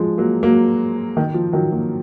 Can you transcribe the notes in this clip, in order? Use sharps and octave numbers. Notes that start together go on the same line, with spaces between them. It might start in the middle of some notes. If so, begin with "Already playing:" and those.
Already playing: F3 G#3
F#3 A#3
F#3 A#3
D#3
F3
D#3 F#3
F#3 A#3